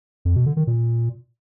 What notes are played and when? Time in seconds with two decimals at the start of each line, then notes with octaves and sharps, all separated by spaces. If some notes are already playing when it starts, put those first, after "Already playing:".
0.25 F2
0.36 B2
0.46 D3
0.57 D#3
0.67 A#2